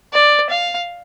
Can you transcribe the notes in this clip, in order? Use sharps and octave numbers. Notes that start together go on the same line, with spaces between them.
D5
F5